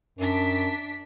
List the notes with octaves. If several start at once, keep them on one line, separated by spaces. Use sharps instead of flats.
F#2 D4 B6